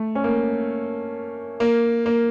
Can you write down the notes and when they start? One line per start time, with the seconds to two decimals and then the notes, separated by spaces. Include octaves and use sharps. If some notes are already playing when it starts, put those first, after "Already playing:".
Already playing: A3
0.15 C#4
0.24 A#3
1.60 A#3
2.06 A#3